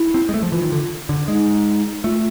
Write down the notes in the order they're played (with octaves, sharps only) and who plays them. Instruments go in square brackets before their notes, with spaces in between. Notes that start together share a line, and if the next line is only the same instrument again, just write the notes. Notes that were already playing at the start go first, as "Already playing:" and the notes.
Already playing: [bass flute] E4
[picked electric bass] C4
G#3
A3
F3
[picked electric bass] E3 [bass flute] F4
[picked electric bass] D#3
D3
D3
[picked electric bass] G#3 [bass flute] D#4
[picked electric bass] A3 [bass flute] F4